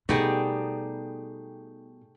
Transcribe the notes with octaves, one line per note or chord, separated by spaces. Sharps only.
B2 G3 A3 B3 D#4 G4 G#4